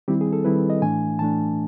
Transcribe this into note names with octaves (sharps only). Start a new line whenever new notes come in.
D#3 G3 C4 E4 G4
G#4
A4
D#3 G3 C4 E4 B4
D#5
A2 E3 A3 D4 G#5
A2 E3 A3 D4 A5